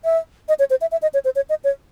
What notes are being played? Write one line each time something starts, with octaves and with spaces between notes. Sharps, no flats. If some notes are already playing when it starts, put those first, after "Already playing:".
E5
D#5
C#5
C5
E5
E5
D#5
C#5
C5
C#5
D#5
C#5